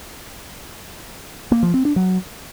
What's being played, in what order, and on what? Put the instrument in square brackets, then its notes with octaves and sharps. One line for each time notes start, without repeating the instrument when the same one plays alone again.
[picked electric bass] A#3
F3
C4
D4
F#3